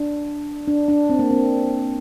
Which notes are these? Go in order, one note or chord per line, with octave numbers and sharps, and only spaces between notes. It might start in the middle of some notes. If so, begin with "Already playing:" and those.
Already playing: D4
D4
D4
C4
A#3
C4